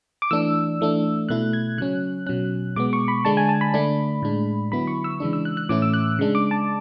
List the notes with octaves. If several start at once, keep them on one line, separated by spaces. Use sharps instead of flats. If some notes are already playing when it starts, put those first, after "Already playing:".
D6
E3 A3 D4 E6
E3 A3 D4
B2 A3 E4 F#6
G#6
C#3 F#3 C#4 F#6
B2 F#3 C#4 F#6
B2 G#3 B3 D6
C#6
B5
D3 G#3 D4 A5
G#5
A5
B5
D3 A3 D4
A2 G#3 D4
D3 F#3 B3 E4 B5
C#6
E6
C#3 E3 G#3 D4
E6
F#6
F#6
A2 E3 A3 C#4 E4 D6
E6
F#6
C#3 G#3 D4
D6
A5